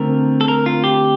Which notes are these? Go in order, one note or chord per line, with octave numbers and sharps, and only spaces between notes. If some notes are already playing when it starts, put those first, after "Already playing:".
Already playing: D3 A3 C4 F4 A#4
A4
A#4
F4
G4